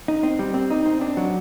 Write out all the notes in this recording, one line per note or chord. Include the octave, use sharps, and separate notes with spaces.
D#4
C4
G3
C4
D#4
C4
D4
F#3